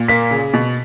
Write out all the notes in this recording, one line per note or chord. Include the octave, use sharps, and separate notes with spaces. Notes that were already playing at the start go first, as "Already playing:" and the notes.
Already playing: A#2
A#3 B6
C#3
B2